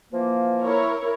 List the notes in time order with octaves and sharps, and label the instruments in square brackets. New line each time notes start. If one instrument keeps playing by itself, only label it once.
[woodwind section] E3 F3 A#3
[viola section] E4 A#4 C#5